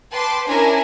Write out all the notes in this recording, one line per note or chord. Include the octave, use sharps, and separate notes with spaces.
B4 G5 A5 C6 D6
C#4 D4 E4 A#4 C#5 G#5